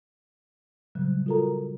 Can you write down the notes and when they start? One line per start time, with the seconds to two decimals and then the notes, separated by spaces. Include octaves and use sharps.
0.95 A#2 C#3 F#3 G3
1.26 F4 F#4 A4 A#4 A#5